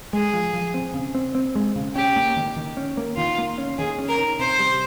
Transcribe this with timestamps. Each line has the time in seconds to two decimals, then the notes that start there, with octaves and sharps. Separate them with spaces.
0.13 G#3 G#4
0.33 F3
0.54 F3
0.74 C4
0.94 C#3
1.15 C4
1.35 C4
1.55 G#3
1.76 C#3
1.95 C#4 G4
2.16 A#3
2.37 D#3
2.56 D#3
2.77 C#4
2.97 A#3
3.17 D#3 F4
3.38 A#3
3.58 C#4
3.78 D#3 G#4
3.98 C#4
4.09 A#4
4.19 D#3
4.39 C3 C5
4.59 G3